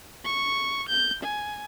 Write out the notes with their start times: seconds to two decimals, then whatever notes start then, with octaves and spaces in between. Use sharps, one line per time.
0.25 C#6
0.89 G6
1.23 G#5